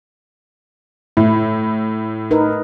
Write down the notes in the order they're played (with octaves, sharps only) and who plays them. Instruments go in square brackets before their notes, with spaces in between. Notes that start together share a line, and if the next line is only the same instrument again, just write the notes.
[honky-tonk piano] A2 [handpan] E4
[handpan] D#4 A#4 B4